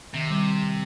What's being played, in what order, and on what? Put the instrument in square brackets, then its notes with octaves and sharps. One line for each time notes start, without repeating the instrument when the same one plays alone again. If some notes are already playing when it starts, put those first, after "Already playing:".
[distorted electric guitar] C3 [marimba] D#3
[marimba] G3